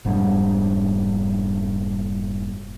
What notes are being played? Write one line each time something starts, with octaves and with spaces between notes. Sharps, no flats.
F1 G#2 G3 D4